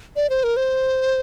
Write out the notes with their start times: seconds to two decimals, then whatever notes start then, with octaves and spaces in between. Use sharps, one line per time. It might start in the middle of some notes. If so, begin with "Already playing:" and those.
0.16 D5
0.30 C5
0.44 A#4
0.57 C5